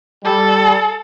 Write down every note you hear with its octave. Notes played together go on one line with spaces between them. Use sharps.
G3 A4